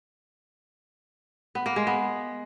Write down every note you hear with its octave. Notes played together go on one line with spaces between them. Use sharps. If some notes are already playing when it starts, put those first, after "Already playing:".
B3
A#3
G#3
B3